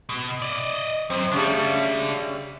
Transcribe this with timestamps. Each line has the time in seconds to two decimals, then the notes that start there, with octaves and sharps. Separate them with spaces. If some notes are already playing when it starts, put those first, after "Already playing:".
0.09 B2
0.42 D5 D#5
1.10 F#2 C4
1.32 C#3 G3 D4 E5